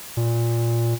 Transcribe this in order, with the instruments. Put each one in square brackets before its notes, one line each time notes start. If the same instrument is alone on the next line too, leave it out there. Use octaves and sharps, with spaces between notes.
[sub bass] A#2